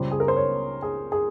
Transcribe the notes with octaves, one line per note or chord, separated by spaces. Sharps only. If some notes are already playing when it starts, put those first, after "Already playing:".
Already playing: C#2 C#3 G3 C5
G#4
A#4
C5
C#5
G#4
G#4